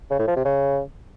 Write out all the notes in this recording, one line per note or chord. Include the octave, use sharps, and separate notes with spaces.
C#3
A2
F3
C3
C#3